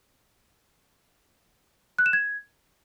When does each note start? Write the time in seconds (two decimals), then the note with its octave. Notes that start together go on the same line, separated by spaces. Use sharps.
1.99 F#6
2.06 E7
2.13 G#6